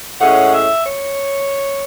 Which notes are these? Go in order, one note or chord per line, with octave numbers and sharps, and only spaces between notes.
A2 G#3 C#4 F#5
E5
C#5